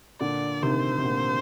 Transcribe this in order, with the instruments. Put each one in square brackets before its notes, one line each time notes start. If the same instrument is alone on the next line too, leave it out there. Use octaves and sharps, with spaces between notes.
[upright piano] A#2 D3 [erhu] D5
[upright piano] C3 D#3 [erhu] C5
[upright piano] C3
A#2 D3